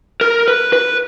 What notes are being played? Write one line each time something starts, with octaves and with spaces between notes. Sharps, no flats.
A#4
B4
B4